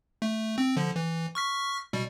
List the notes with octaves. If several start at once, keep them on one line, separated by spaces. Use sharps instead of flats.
A3
C4
D3 F3
E3
C#6 F6 B6
B2 G3